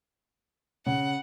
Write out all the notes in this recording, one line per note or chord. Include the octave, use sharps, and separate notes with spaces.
C#3 F#5